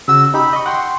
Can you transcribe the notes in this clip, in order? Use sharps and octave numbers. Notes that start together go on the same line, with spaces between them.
C#3 F#4 E6
D#4 G4 B5
D#5 C#6
F#5 G5 C6 C#6